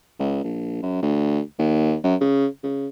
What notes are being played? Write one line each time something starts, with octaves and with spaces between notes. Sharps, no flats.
C#2
A#1
F#2
D2
D#2
F#2
C#3
C#3